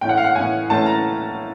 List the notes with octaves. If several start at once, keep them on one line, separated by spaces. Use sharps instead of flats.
A2 E3 A3 C#4 G5
F#5
F5
F#5
A2 E3 A3 C#4 G#5
A2 E3 A3 C#4 A5
A#5